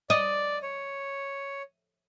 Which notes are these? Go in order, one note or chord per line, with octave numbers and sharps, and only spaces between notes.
D5 D#5
C#5